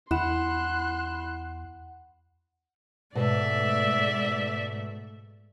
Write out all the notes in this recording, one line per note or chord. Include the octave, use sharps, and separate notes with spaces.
E2 E4 F#5 B5 C6 F#6 E7
G#2 B2 A3 B4 D5 E5 A5